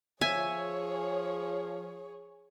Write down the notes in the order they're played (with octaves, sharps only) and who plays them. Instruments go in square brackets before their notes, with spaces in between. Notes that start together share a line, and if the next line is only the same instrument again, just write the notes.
[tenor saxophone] F3 [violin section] G#4 C#5 [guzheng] E5 [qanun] G#5